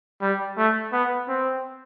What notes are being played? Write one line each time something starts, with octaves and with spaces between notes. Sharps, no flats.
G3
A3
B3
C4